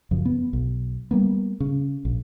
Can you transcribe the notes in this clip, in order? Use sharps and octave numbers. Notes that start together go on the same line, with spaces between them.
F#2 C#3 F3
B3
B1
G3 A#3 B3
C#3
A#1